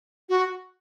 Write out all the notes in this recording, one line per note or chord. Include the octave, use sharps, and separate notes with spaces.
F#4